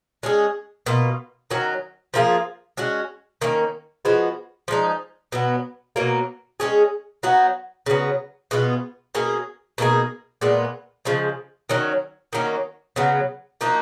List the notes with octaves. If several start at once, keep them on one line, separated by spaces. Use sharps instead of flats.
G#3 C#4 G#4
B2 A#3 F4
D#3 F#3 C#4
F3 A#3 F4 G#4
G#3 C#4 F#4
D#3 A#3 C#4
F3 G#3 B3 F#4
F3 G#3 D#4
B2 F#3 B3
B2 F#3 A#3
G#3 C#4 G#4
F#3 B3 D#4 F#4
C#3 F#3 B3
B2 G#3 B3 F4
B2 A#3 C#4 G#4
B2 A#3 D#4 G#4
A#2 G#3 B3 F4
C#3 F3 G#3
D#3 F#3 C#4
D#3 F#3 A#3 C#4
C#3 F#3 B3
F3 A#3 D#4 F#4